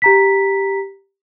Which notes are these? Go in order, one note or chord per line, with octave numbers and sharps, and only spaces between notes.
G4 A#5 B6